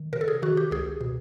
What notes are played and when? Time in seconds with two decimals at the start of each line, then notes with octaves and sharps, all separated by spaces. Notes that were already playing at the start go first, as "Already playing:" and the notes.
Already playing: D#3
0.13 C3 A#4
0.21 A4
0.28 G#4
0.42 D#3 F#4
0.57 G4
0.71 C#2 G#4
1.01 B2